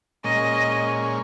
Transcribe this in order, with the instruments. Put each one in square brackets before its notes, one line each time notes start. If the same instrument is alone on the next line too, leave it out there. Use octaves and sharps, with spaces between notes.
[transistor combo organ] A#2 G#3 C#4 [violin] D#5